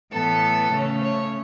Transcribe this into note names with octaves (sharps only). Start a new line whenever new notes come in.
A2 E3 B3 A4
C#3 A3 C#4
C#5